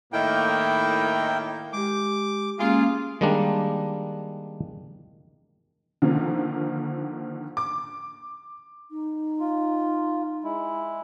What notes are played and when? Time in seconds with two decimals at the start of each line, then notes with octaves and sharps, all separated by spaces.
0.13 A2 D#3 A#3 E4 G5
1.73 G#3 G4 D6
2.59 G#3 A#3 C#4 F4 G#4
3.21 D#3 G3 G#3 A#3 D4
6.02 D3 D#3 F3 A#3
7.57 D6
8.89 D#4
9.40 F4
10.44 G#3 E4